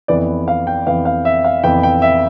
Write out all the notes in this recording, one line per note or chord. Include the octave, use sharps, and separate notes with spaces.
F2 E3 B3 D5
F5
G5
F2 E3 B3 F5
F5
E5
F5
F2 E3 B3 G5
G5
E5